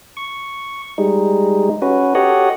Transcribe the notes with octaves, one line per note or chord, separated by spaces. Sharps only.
C#6
G3 G#3 D#4
C#4 F#4 B4
F#4 G4 A4 C#5 D#5 F#5